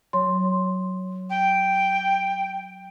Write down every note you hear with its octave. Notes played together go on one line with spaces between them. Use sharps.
F#3 C#5 C6
G5